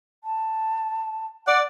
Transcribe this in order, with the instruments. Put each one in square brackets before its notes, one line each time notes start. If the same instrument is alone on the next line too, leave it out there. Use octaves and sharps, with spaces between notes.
[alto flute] A5
[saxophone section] D5 [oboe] F#5